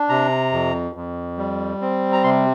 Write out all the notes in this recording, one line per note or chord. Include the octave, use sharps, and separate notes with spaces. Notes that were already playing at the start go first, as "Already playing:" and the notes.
Already playing: D4
C3 A#5
F2
F2
G3
C4
A#5
C3 C6